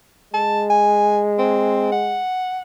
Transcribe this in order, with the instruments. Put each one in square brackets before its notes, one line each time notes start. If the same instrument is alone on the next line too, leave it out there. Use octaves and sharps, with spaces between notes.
[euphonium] G#3 [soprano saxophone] A5
[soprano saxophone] G#5
C4
F#5